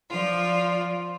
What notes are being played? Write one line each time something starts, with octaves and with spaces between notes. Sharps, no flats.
F3 F4 D5